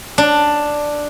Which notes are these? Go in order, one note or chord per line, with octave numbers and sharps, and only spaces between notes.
D4